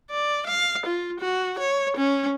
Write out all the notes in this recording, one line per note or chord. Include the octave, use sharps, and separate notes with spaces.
D5
F5
F4
F#4
C#5
C#4